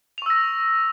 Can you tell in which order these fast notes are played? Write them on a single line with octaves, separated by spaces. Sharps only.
F7 C#6 E6 A#6